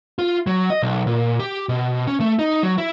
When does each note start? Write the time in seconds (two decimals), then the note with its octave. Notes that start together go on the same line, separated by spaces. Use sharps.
0.19 F4
0.47 F#3
0.70 D#5
0.83 B1
1.07 A#2
1.39 G4
1.69 B2
2.07 C#4
2.20 A3
2.39 D#4
2.63 F#3
2.78 E4